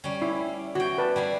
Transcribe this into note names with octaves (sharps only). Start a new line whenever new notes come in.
G3 C#4
E4
E3 F#4 G5
B4 D5 A5
G3 E4 F5